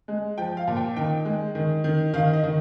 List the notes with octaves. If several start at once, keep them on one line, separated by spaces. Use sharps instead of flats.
G#3
F3 G5
F5
A#2
G5
D#3 G5
G#3
D#3
D#3
D#3 F5
D#5
D#3